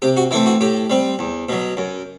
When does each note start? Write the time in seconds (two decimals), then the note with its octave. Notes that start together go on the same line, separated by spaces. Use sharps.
0.02 C3 G4
0.17 F#4
0.31 E3 A3 C4 E4
0.46 F#4
0.61 A2 G4
0.90 G3 C4
1.19 E2
1.49 B2 F#3
1.77 F#2